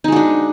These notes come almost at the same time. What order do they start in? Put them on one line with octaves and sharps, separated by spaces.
D#4 G#3 F#4 D4